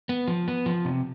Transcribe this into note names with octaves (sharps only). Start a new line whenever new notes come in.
B3
F3
B3
F3
C3